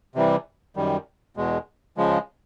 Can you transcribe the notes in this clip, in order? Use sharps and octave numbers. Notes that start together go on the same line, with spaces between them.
C3 E3 G3
F#2 D#3 G3
E2 B2 G#3
C#3 F3 G#3